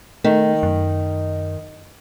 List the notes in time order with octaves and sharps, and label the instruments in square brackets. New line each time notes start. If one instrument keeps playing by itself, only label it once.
[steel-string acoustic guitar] D#3 [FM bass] A3
[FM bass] F#2